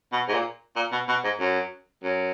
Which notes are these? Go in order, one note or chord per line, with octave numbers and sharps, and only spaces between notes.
B2
G#2
A#2
A#2
B2
B2
G#2
F#2
F#2